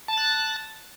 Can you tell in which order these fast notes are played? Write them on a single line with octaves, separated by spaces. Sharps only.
A5 A6 F#6